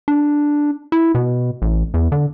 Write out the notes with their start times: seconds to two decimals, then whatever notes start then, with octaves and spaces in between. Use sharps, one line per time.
0.08 D4
0.92 E4
1.15 B2
1.62 A1
1.94 E2
2.12 D3